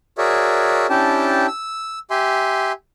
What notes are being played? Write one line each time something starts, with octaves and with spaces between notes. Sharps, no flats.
F#4 G#4 A#4 C#5 D5 E5
C#4 D4 E4 G4 G5 A5
E6
G4 E5 G#5 C6